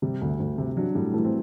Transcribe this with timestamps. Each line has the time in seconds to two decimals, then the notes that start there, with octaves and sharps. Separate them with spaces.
0.02 C3 G3
0.22 D2
0.40 D2
0.58 C3
0.77 F#3 D4
0.95 A2 G3
1.14 E3 A3
1.25 C4